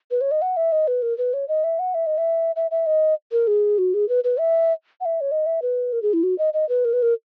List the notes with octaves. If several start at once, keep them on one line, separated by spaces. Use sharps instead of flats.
B4
C#5
D#5
F#5
E5
D#5
B4
A#4
B4
C#5
D#5
E5
F#5
E5
D#5
E5
E5
E5
D#5
A#4
G#4
F#4
G#4
B4
B4
E5
F#5
E5
C#5
D#5
E5
B4
A#4
G#4
E4
F#4
D#5
D#5
B4
A#4
B4
A#4